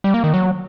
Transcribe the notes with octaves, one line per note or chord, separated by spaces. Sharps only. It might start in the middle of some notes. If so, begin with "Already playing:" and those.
G3
A#3
D#3
F#3